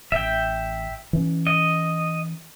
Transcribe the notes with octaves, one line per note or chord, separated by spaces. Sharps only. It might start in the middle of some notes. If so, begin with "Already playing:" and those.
A1 E5 G5
E3 C#4
D#5